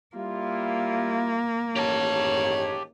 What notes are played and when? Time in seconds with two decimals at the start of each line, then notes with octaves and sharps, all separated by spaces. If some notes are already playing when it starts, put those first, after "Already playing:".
0.16 G3 A#3 E4 F4
1.76 A1 G#2 D#3 G4 C#5 A5